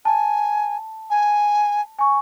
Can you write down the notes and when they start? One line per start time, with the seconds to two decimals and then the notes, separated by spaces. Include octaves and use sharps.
0.05 G#5 A5
1.10 G#5
1.99 G#5 C#6